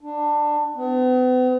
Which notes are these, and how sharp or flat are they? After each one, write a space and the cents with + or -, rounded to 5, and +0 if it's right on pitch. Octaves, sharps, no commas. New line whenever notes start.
D4 +15
B3 +45